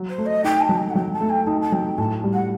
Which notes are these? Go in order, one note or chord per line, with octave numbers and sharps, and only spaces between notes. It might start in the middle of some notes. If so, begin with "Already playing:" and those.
Already playing: F#3
C5
A3
D#5
D#4 G5
A5
F#3
G5
F#5
F#3 G5
A5
A3
G5
D#4 A5
A5
F#3 G5
A2 A5
G3
F#5